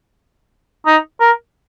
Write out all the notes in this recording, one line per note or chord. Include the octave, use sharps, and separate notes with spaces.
D#4
A#4